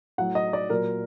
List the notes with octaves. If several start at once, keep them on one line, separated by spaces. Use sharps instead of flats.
A2 F#3 F#5
D#5
D5
A#2 F#3 A#4